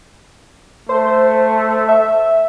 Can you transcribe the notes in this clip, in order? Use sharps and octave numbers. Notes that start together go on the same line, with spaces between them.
A3 C5
E5